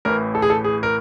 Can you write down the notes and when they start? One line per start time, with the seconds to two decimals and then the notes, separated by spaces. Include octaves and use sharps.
0.05 A1 A2 E3 A#4
0.35 A4
0.42 G#4
0.50 A4
0.64 G#4
0.83 A#4